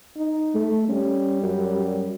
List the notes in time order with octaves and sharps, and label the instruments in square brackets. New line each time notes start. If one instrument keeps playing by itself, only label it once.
[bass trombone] D#4
[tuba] A3
[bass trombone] G3 [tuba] C#4
[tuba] F#2